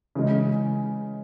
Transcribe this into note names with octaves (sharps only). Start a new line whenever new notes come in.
C#3 E3 G#3